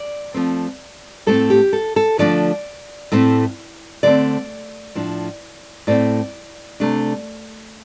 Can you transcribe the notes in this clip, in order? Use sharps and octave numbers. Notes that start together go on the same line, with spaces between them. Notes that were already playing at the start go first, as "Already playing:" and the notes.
Already playing: D5
F3 A3 C4
A2 A3 C4 A4
G4
A4
A4
D3 F3 A3 D4 D5
A2 A3 C4
D3 A3 C4 D5
A2 F3 D4
A2 A3 C4 D5
C3 A3 D4